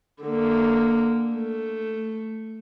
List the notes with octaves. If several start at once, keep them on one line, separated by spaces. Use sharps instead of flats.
D3 A#3
A3